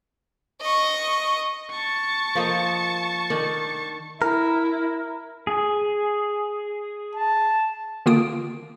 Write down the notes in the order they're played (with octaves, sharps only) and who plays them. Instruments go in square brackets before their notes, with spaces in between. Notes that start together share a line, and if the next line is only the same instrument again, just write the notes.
[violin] D#5 C#6
[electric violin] A5 C#6
[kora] F3 A#3 D#5
D#3 D4
[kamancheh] E4 [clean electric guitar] A#4
[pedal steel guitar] G#4
[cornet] A5
[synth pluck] D3 D#3 A#3 F4 D#6 D7